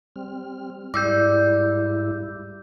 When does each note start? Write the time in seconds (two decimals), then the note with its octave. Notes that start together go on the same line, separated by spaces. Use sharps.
0.16 G3 C4 F6
0.94 G#2 G3 E4 D6 E6 G6